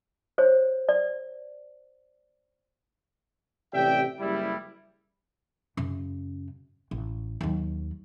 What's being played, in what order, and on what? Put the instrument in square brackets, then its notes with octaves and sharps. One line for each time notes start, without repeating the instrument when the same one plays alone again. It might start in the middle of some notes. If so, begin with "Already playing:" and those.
[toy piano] C5 C#5
D5
[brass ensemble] A1 C3 G4 D5 E5 G5
F#1 G3 E4
[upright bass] F#2 C#3
A1
D#2 F#3